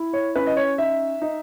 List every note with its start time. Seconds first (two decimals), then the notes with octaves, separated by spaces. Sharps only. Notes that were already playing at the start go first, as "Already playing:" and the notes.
Already playing: E4
0.13 C#5
0.36 C#4 B4
0.47 D#5
0.57 C#5
0.78 D#4 E5
1.22 D#4